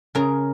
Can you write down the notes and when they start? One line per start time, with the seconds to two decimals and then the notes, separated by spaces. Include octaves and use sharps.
0.15 C#3 A#4